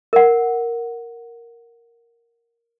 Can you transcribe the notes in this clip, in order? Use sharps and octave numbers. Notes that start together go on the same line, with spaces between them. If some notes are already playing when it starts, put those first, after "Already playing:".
A#4 F#5